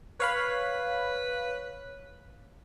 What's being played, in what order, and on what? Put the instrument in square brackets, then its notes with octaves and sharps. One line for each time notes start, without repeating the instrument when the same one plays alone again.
[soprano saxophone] B4 [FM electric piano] C#5 F5 B5